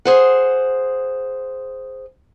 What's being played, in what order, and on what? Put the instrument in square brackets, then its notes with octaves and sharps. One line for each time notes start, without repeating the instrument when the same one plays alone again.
[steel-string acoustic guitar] G#4 C5 F#5